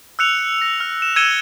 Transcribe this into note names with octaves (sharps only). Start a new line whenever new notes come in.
E6 F#6 C#7 F7
A#6
F6
E7
E6 G#6 C#7 D#7 E7 G7